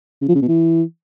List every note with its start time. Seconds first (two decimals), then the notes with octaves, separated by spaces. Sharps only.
0.22 C#3
0.28 F3
0.35 C#3
0.42 B2
0.48 E3